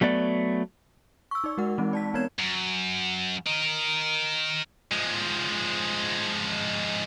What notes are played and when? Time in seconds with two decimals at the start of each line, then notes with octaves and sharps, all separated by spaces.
0.01 F#3 A3 B3 D5
1.31 C#6 E6
1.44 D#4 D5
1.58 G#3 F#4 A#4 F#5
1.78 E3 G#3 C4 D#4
1.93 D5 A5 B6
2.14 B3 C4 A#4 C#5 G#6 E7
2.39 F#2
3.46 A#4 D#5
4.92 F3 G#3